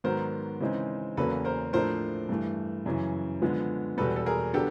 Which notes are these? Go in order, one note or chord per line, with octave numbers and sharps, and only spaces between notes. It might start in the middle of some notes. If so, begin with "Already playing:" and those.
G#2 D#3 F#3 B3 A#4 C5
C#3 E3 G#3 C4 D#4
E2 C#3 F#3 A#3 A4 B4
A#4 C5
A2 F3 A3 D4 A#4 C5
G2 E3 A3
F#2 C#3 E3
D3 F3 G#3 B3
E2 B2 G3 A4 B4
A4
G#4 A#4
D3 F#3 B3 D4 G4 A4